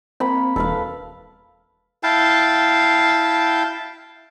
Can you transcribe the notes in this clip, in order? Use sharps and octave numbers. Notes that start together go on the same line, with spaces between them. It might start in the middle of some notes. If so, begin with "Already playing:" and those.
A#3 C4 B5
E1 A4 B4 F5
E4 F5 G5 A5